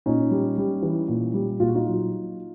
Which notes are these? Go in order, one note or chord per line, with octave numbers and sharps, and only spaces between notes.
A#2 C#4 D#4
G3
G3
E3
A#2
G3
A#2 F4
F#4
D#4 F4
F#3